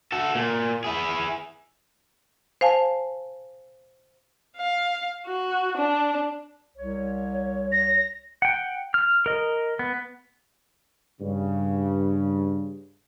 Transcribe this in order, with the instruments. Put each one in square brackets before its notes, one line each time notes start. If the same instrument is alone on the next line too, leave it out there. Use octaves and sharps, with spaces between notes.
[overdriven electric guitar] F#4 A4
A#2
E4 G#4
[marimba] C5 F5 G#5 A5
[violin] F5
F#4
D4
[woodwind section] C2 C#5
[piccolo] A#6
[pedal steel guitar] F#5 G5
F6
A#4 D#5
B3
[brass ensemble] G2 C#3